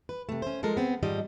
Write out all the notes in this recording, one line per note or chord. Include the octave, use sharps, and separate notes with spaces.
B4
C3 A3
C#4 C5
F3 G#3 A4 A#4
B3 C4
G#2 D#3 F3 G3 D#5